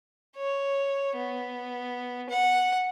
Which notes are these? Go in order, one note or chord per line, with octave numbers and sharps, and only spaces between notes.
C#5
B3
F#5